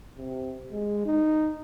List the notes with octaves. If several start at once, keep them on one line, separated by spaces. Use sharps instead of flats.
C3
G#3
D#4